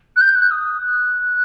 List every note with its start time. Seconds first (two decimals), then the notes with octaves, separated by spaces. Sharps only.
0.16 F#6
0.20 G6
0.35 F#6
0.50 D#6
0.80 F#6